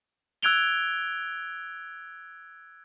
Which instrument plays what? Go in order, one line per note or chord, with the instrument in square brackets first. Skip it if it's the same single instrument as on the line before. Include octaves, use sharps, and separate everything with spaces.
[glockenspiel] E6 F#6 G#6 D7 F7 G7